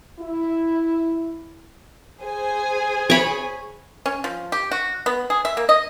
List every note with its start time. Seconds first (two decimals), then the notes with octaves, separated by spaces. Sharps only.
0.20 E4
2.22 G#4 C5 G#5
3.10 C#5 B5
4.06 C#4
4.24 F3
4.52 G4
4.71 F#4
5.06 B3
5.30 G#4
5.45 E5
5.57 A#3
5.69 D#5